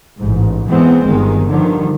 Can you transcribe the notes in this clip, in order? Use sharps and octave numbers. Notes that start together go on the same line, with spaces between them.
A1 G#2
E3 G#3 B3 C4
G1 D#3 G#3
G2 D3 D#3 F3